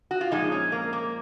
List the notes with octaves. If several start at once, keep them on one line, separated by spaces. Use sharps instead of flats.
F#4
F4
A#2 F3 G#3 D#4
C#4
A#3
A#3